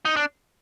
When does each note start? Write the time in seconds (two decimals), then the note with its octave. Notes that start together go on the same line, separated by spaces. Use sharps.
0.05 D#4
0.16 D4